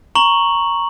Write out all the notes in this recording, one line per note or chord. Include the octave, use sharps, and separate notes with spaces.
A#5 C#6 F#7